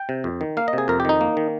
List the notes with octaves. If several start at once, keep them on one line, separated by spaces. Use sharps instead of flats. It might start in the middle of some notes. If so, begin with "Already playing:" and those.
Already playing: G5
C3
F2
D#3
A#3 F5
D#5
C3 G#4
F2 A#4
G4
D#3 D#4
A#3
D#3